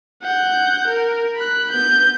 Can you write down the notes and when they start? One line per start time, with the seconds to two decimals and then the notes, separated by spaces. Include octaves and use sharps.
0.22 F#5 G6
0.87 A#4
1.36 B5 F#6
1.71 B3 G6